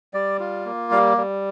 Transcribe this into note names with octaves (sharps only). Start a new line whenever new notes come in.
G3 D5
F4
A#3
G3 F5
G3